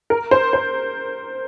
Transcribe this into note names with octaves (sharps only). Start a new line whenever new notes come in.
A#4
C5
C5